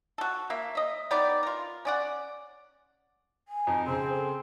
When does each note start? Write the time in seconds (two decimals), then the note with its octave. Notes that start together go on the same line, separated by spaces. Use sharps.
0.18 F#4 A4
0.50 A#3 E5
0.75 D#5 E5
1.11 B3 D#4 G4 D5
1.43 F4 A#4
1.85 C#4 D5 F#5
3.48 G#5
3.67 F2 D#4
3.86 C#3 C4 G#4 C5
4.13 A4